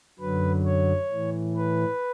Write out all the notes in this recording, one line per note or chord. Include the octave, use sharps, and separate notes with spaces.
F#2 D3 F#3 B4
C#5
A2 E3
B4